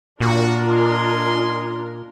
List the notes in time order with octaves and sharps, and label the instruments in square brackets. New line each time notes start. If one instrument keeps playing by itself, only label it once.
[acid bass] A#2 [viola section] D4 F4 A#4 [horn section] F#4
[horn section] D#5 G#5 C6